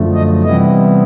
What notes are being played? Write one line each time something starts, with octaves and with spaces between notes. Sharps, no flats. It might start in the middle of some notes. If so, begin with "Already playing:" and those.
Already playing: F#2 D3 F3 A3
D#5
C3 E3 G3 B3 E4 D#5